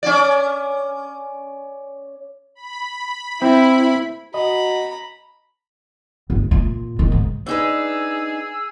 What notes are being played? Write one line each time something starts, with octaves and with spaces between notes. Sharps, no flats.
C#4 D5
B5
C4 E4
F#4 D#5 A#5 B5
G1
A#2
D#3
G#2
D4 D#4 G#4 B4 E6